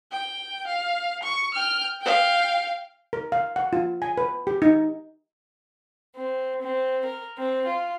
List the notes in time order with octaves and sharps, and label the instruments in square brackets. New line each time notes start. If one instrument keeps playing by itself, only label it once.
[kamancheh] G5
F5
C#6
G5 F6
F5 G5
[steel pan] A#4
F5
F#5
F4
G#5
B4
G4
D#4
[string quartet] C4
C4
A#4
C4
F4